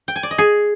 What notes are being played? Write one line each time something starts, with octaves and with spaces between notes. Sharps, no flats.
G5
G#5
D5
D#5
G#4